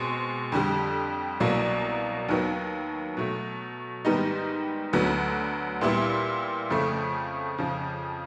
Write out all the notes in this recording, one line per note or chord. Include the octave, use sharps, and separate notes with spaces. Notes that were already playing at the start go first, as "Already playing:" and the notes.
Already playing: B2 G#3 C4
F2 D3 G3
C2 B2 F#3 A#3
D#2 D#3 F#3 B3
B2 F#3 A3
G#2 D#3 G3 B3 D#4
D2 D3 F#3 B3
A#2 G3 B3 E4
F2 C#3 F3 A3
F2 C#3 F3